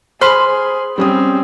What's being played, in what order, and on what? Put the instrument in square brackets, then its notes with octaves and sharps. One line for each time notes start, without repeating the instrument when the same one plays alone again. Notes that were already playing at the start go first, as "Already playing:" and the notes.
[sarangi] G#4 [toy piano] C5 [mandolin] B5 C6 F6
[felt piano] G3 C#4 D#6 [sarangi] C4